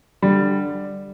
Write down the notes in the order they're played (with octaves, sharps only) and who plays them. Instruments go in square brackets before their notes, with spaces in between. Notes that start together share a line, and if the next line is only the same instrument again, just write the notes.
[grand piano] D3 G3